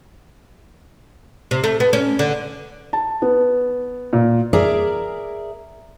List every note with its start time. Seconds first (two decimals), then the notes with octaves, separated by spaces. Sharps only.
1.51 C3
1.64 A3
1.80 B3
1.93 C#4
2.19 D3
2.93 A5
3.22 B3
4.13 A#2
4.53 G#4 A#4 D5 E5 A#5